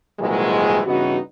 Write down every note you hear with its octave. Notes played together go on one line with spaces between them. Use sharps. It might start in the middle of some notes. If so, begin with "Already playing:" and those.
C2 A#2 D#3 E3 F#3 G#3
G2 C#3 E3 B3 D#4 F#4